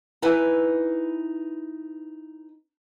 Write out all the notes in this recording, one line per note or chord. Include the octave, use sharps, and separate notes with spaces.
D#4 E4 B4 G#5